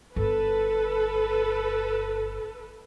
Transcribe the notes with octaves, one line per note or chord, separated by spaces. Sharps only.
G1 A4 B4